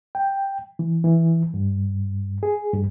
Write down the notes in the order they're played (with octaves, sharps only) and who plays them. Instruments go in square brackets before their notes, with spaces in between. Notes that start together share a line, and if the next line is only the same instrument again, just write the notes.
[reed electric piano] G5
E3
E3
G2
G#4
G2